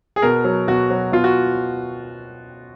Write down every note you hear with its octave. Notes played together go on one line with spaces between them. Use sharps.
G#4
B2 A#4
F#3
B2 F#4
F#3
B2 F4
F#4